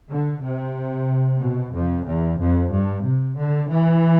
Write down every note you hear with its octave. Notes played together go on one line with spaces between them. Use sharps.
D3
C3
B2
F2
E2
F2
G2
C3
D3
E3